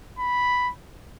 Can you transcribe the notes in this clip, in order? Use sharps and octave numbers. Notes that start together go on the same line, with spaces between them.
B5